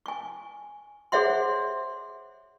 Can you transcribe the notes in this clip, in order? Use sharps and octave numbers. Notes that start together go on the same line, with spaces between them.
G#5 C#6
G#4 C5 C#5 E5 F#5 C6